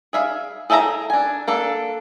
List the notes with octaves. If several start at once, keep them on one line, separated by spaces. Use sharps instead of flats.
G#4 E5 F5
G#4 A4 E5 G5 A#5
D4 G#5
A#3 D4 A4